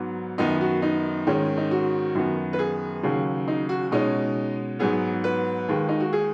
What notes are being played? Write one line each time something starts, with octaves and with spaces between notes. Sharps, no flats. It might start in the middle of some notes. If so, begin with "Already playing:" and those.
Already playing: G#2 F#3 B3
F#2 D#3 B3 D#4
F#4
D#4
G#2 D#3 G#3 C#4
D#4
F#4
F#2 D#3 B3
B4
G#4
D#2 C#3 F#3
D#4
F#4
B2 G#3 C#4 D#4
G#2 F#3 B3 G#4
B4
D#2 D#3 G#3
D#4
F#4
G#4